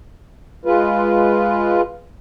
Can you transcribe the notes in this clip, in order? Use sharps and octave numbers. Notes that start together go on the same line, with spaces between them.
G#3 F4 B4